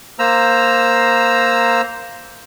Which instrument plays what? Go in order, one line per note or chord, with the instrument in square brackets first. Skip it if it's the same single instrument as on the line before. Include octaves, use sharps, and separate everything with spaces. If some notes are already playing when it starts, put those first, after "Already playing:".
[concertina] A#3 C5 A#5 E6